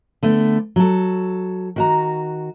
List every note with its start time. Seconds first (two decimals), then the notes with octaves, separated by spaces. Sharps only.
0.23 D3 A3 B3
0.76 F#3 A4
1.76 D#3 F#4 A#5